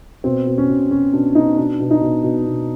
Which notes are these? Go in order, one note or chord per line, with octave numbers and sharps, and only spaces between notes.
B2 C4
B2
C#4
B2
B2 C#4
B2 D4
B2 D#4
B2 D4
B2
D#4
B2
B2
B2